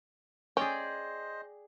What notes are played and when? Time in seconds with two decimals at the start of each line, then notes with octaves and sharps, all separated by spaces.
0.57 C#4 G#4 C5 D5 D#5 G5